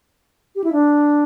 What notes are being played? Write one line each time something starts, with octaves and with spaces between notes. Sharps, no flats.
G4
E4
D4